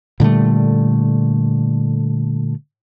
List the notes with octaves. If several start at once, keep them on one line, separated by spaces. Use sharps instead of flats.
A#2 D3 G3 A3